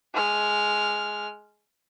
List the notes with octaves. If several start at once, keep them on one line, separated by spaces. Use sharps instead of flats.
G#3 F6